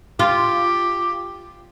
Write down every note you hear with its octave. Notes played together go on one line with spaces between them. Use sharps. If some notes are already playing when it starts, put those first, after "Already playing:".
F4 G4